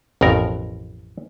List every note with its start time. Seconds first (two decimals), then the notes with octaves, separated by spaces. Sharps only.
0.21 A1 F2 B2 A#4